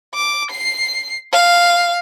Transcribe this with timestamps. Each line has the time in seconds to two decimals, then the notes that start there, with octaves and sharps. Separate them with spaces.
0.14 D6
0.51 C7
1.33 F5